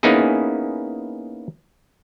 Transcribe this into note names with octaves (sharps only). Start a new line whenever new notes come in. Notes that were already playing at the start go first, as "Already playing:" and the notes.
A#3 B3 C#4 D#4 E4 G#4